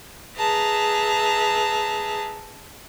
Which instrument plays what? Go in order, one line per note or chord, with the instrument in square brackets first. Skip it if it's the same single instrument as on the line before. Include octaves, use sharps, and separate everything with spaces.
[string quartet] G#4 B4 E5 A5 A#5